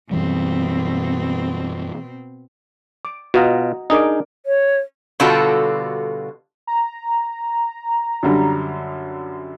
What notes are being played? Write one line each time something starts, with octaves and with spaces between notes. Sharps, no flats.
F#2 B2 E3 G3 C4
D6
B2 F4 F#4 D#5 A#5
D4 D#4 G#4 A#4 D6
C#5
B2 D3 G3 F4 F#4 A4
A#5
F#2 D3 G3